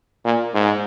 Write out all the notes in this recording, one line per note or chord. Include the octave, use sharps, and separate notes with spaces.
A#2
G#2